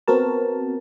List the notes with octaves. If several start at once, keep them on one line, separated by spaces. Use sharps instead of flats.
B3 C4 F#4 A#4 A5